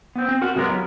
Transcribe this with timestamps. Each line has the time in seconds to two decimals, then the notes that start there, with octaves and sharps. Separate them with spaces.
0.16 B3 C4
0.29 C4
0.41 F#4 A#4 F#5
0.55 F#2 C3 G#3 B3 A#4
0.69 F#3 C#4 E4 F4